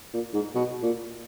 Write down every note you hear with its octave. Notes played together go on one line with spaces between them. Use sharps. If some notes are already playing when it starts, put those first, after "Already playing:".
A#2
G#2
B2
A#2